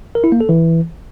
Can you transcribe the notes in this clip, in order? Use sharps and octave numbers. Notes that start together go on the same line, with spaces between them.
A#4
E4
A#3
A4
E3